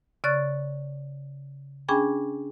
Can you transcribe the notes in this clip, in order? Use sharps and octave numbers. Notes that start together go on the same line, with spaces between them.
C#3 D5 C#6 F#6 A6
C#4 D4 G#4 G5 G#5 B5